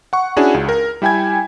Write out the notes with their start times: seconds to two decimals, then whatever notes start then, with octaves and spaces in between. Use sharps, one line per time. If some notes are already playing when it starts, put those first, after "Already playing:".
0.13 F#5 C#6
0.37 C#4 D4 E4 F#4 G#4
0.54 C#2
0.69 A#4
1.02 G3 E4 G5 G#5 G#6